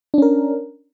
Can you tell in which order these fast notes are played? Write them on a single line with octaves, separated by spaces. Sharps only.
D4 C#4 A#4